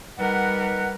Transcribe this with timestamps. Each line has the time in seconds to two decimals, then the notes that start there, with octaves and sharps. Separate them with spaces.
0.19 G3 D#4 A#4 B4 F#5